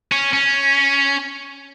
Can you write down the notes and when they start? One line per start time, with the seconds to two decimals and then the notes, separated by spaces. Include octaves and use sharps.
0.12 C#4
0.34 C#4